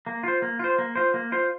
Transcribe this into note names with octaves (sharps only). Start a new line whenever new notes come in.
A#3
F4 C5
A#3
F4 C5
A#3
F4 C5
A#3
F4 C5